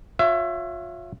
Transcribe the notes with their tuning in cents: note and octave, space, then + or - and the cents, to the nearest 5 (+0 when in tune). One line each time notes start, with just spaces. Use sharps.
F4 +35 C#5 +0 E5 +25